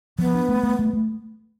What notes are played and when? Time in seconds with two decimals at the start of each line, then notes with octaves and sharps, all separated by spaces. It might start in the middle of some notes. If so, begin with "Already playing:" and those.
0.19 F3 B3
0.35 D4
0.49 A3
0.63 A3
0.79 A3
0.93 A3